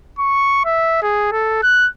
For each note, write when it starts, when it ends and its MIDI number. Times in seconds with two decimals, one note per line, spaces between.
0.19 0.61 85
0.65 1.01 76
1.02 1.28 68
1.32 1.60 69
1.63 1.88 90